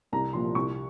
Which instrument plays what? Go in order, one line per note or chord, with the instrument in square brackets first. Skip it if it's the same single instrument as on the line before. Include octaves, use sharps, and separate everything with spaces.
[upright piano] C2 A#5
A#2 F3 C6
C2 C#6